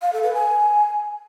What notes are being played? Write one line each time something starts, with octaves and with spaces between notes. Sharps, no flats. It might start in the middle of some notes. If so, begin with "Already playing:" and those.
F5
A4
B4
G#5